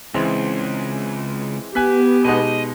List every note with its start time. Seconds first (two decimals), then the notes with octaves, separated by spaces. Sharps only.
0.14 C#2 E3 G#3 C4
1.75 B3 G4 G#5 F#6 B6
2.25 B2 G#3 D#4 D#5